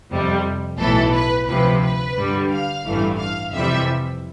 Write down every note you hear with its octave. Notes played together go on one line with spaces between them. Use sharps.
F2 C3 G3
B1 A2 E3 A4
B4
D2 C3 F3 B4
B4
G2 D3 G3
F5
A1 G2 E3 A3
F5
F2 C3 E3 G3 E5